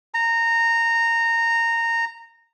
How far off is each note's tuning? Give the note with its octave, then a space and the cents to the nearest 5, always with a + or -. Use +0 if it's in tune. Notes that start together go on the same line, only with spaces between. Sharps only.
A#5 -15